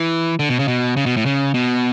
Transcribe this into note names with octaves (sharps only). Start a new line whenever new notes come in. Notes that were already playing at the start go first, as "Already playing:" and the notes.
Already playing: E3
D3
B2
C#3
B2
C#3
B2
A2
C#3
B2